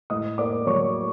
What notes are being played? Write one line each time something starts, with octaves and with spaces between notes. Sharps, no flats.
A2 D#5 D#6
A#3 D5 D6
F#3 C#5 C#6